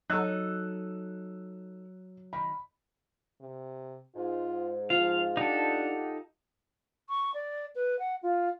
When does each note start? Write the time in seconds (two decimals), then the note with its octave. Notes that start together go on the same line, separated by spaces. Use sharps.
0.10 F#3 D#4 A4 E6 F#6
2.33 D#3 B5
3.40 C3
4.16 G#2 F4
4.90 F3 F4 F5
5.37 D4 D#4 G4 A4 F#5
7.09 C#6
7.34 D5
7.75 B4
7.99 F#5
8.23 F4